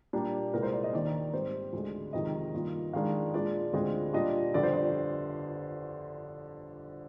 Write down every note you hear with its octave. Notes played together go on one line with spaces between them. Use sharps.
A#2 G3 A#3 D4
C2 A#2 G#3 A#4
C5
D5
D#5
D#2 D#3 A#3 D4 D5
G#2 G3 C4 C5
D2 D3 G#3
F2 C3 D#3 G#3 D#4 D#5
G2 D#3 A#3 F4
F2 D#3 G#3 D4 F5
A#2 G#3 D4 F4 D5
D2 D3 G#3 C4 F4 D#5
A#2 G3 D4 F4 D#5
G1 F2 D3 G3 D5
C5
D5